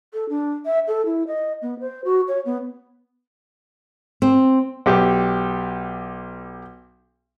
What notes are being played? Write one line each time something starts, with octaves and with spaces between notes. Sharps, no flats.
A4
D4
E5
A4
E4
D#5
B3
C5
F#4
C#5
B3
C4
B1 G4